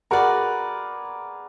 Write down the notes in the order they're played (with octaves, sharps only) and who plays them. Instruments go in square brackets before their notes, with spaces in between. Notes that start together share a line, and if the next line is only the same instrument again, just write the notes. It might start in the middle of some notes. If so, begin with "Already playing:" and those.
[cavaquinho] F#4 B4 D5 [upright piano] G#4 A#4